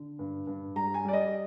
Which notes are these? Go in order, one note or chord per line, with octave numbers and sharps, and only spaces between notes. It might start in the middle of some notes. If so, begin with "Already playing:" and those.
Already playing: D3
G2
G2
G3 A#5
G#5
G3 D5
D#5